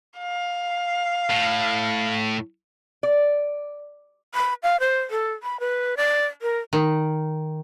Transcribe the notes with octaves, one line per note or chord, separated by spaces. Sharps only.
F5
A2
D5
B5
F5
C5
A4
B5
B4
D5
A#4
D#3